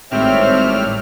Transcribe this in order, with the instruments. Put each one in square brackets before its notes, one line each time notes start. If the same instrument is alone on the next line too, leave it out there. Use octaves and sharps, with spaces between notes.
[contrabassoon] G#1 [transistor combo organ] A2 G3 F6 [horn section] C4 [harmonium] C#5 E5